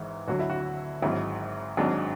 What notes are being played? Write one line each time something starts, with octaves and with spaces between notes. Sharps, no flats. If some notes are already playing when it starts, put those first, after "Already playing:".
Already playing: G#1 G#2 E3 E4
D2 D3 F#3 F#4
E4
F#4
G#1 G#2 F#3 E4
G#1 G#2 F#3 D4